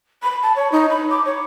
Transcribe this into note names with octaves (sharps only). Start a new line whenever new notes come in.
B5
A5
C#5
D#4
B5
D6
C#5